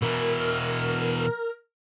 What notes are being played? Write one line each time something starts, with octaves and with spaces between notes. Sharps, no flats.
B2 E3 A#4